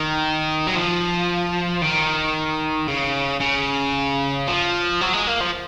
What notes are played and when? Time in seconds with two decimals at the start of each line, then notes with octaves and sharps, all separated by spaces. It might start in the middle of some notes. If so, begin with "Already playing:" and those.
Already playing: D#3
0.67 F#3
0.76 F3
1.82 D#3
2.88 C#3
3.40 C#3
4.47 F3
5.01 F#3
5.13 G#3
5.27 A#3
5.41 F3